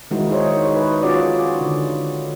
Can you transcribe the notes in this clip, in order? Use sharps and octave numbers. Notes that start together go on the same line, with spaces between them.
D#3 G#3 D#4 E4 F#4
D#4 G#4 C5 C#5
B4
C#4 F4 F#4 G#4 C#5 D5
D3